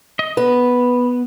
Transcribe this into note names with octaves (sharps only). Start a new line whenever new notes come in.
D#5
B3 B4